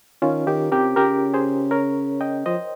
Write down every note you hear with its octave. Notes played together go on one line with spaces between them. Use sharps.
D#3 C#4 F4
D#3 D#4 G4
C3 G4 A#4
C#3 G4 A#4
G#4 C5
A#4 C#5
D#5 G5
F3 C5 D#5